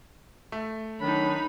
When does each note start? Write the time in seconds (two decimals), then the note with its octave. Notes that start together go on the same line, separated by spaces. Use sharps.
0.52 A3
1.01 D#3 F#3 D4 D#4 B5